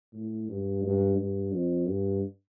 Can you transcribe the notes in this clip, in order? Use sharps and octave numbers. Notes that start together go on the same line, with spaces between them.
A2
G2
G2
G2
F2
G2